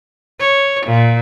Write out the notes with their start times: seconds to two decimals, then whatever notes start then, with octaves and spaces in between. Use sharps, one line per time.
0.40 C#5
0.86 A#2